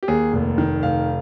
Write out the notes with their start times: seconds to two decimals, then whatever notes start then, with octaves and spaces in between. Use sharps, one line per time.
0.03 G4
0.08 D#2 G#4
0.33 F1
0.58 D#3
0.83 F1 F5